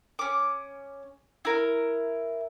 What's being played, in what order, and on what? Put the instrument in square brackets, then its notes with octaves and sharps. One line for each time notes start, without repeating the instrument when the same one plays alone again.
[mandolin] C#4 D6
E4 A#4